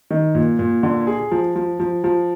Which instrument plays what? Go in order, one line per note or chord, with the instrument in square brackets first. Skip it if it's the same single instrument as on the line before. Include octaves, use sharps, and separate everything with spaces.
[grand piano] D#3
A#2
A#2
D3
G#4
F3
F3
F3
F3